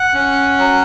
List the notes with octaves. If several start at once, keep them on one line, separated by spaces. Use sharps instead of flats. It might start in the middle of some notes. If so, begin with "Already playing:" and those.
Already playing: F#5
C#4
F#3